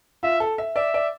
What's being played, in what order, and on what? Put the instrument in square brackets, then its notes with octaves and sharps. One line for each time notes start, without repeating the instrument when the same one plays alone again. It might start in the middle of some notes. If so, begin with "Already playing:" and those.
[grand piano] F4 [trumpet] E5
[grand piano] A4
E5
[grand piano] D5 [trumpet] E5
[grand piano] D5